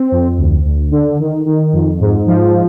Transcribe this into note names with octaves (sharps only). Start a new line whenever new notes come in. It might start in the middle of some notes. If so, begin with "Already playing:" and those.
Already playing: C4
F2
D2
D2
D3
D#3
D#3
F2
G#2
F3